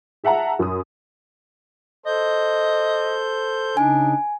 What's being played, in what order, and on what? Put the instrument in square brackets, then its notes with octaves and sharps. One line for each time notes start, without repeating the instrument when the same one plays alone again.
[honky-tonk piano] G#4 E5 F#5 A5 A#5
F#2 D#6
[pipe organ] A4 C5 G6 [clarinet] D#5
[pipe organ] C#3 D#4 [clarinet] D4 [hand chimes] G#5